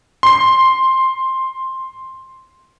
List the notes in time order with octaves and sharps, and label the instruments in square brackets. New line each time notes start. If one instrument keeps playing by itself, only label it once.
[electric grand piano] C6 C7